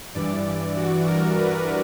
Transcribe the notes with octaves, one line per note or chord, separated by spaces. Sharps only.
G2 E3 D5
F#4
A#4
B4